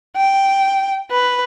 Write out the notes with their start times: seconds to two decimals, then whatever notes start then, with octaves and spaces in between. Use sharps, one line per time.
0.16 G5
1.11 B4